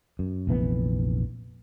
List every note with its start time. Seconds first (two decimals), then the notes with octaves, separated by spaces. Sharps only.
0.19 F#2
0.47 F1 A#1 E3 B3